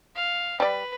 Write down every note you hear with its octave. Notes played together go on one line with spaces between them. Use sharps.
F5
G3 B4 D5